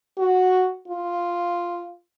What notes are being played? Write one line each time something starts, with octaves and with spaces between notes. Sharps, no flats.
F#4
F4